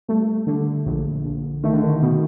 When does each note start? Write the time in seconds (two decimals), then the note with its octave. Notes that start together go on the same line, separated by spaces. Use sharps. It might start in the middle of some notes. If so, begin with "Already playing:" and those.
0.08 G3 A3
0.47 D3
0.86 A#1
1.24 A#1
1.64 D#3 A3
1.73 D3
1.83 D#3
2.02 B2